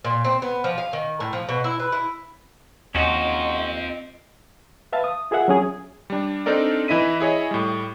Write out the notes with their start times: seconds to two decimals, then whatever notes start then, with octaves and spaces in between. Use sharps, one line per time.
0.04 A#2
0.24 C4
0.42 B3
0.64 F3
0.78 F5
0.93 D#3
1.20 A2
1.33 F3
1.49 B2
1.64 E4
1.80 B4
1.92 E4
2.95 D#2 C4 C#4 F4 F#4 D#5
4.93 B4 E5 F5 A5
5.04 D#6
5.31 F4 G#4 A#4 E5 F#5
5.48 F#3 C#4 G#4
6.10 G3 D4
6.46 C4 D4 D#4 A4 A#4 D5
6.88 E3 E4 D#5 B6 D#7
7.20 E4 G#4 C#5 D#5
7.51 A2 G3